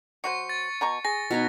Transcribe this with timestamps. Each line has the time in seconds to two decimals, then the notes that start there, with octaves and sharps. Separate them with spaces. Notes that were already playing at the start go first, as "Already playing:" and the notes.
0.24 F#3 F#4 C5 C#6 C#7
0.49 A6
0.81 B2 A#5 C#6
1.05 G#4 A#6
1.31 B2 D#4 C#5